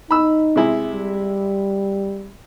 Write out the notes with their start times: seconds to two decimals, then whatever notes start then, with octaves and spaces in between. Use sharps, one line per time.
0.11 D#4 B5 E6
0.56 C3 G#3 E4
0.92 G3